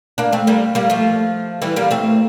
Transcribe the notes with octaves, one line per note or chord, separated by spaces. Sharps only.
A#3 D4
A3 C4
G3 A#3
G3 A#3
F3 A3
E3 G3
G3 A#3
A3 C4